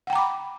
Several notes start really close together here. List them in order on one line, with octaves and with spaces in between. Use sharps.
F#5 G5 A#5 D6 B5